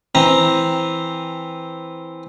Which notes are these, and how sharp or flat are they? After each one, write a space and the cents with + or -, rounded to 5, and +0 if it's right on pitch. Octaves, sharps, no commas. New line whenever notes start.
E3 +0 C4 +0 A#5 +0